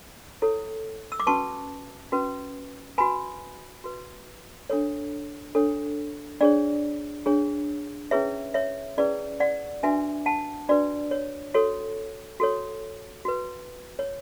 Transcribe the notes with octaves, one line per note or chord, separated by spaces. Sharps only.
E4 A4 C#5
E6
D6
C#4 F#4 B4 A5 C#6
C#4 F#4 B4
F#4 B4 G#5 B5
F#4 B4
D4 A4 C#5
D4 A4 C#5
D4 G#4 C#5 D5
D4 G#4 C#5
C#4 E4 G#4 B4 C#5 E5
C#5 E5
C#4 E4 G#4 B4 D5
D5 F#5
D4 F#4 B4 E5 G#5
F#5 A5
D4 F#4 B4 D5
C#5
F#4 A4 C#5
F#4 A4 C#5
F#4 B4
C#5